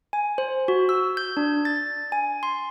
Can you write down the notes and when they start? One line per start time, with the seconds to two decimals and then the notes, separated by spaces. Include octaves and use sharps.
0.13 G#5
0.38 C5
0.68 F#4
0.89 E6
1.17 G6
1.37 D4
1.65 A6
2.12 G#5
2.43 C6